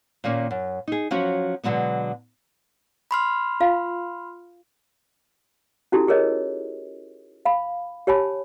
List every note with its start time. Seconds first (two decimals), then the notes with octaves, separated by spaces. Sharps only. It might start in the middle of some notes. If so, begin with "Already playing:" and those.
0.24 A#2 D#3 A#3 C#4
0.51 F#2
0.88 D#4 G#4
1.11 F3 F#3 C#4 F#4
1.64 B2 D3 F#3 G#3 B3
3.11 B5 C6 F6
3.60 F4 F5
5.92 C#4 D#4 E4 F#4 G4 A4
6.07 G4 G#4 A#4 C#5 D#5
7.45 F5 B5
8.07 G4 C#5 G#5 A5 B5